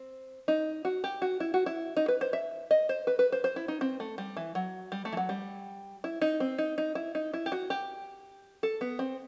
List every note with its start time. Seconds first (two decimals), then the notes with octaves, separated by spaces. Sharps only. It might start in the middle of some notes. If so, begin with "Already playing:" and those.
Already playing: C4
0.48 D#4
0.85 F#4
1.04 G4
1.22 F#4
1.40 E4
1.54 F#4
1.66 E4
1.97 D#4
2.08 B4
2.21 C5
2.33 E5
2.71 D#5
2.89 C5
3.07 B4
3.19 B4
3.32 C5
3.44 C5
3.56 E4
3.68 D#4
3.81 C4
4.00 A3
4.18 G3
4.37 E3
4.55 F#3
4.92 G3
5.05 A3
5.12 E3
5.17 F#3
5.29 G3
6.04 E4
6.22 D#4
6.40 C4
6.58 D#4
6.78 D#4
6.95 E4
7.15 D#4
7.33 E4
7.46 G4
7.52 F#4
7.70 G4
8.63 A4
8.81 B3
8.99 C4